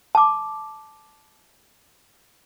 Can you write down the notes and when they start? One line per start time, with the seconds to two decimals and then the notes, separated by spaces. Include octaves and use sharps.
0.15 A5 D6